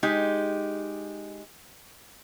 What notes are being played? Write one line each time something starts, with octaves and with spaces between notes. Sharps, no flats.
G#3 D#4 G4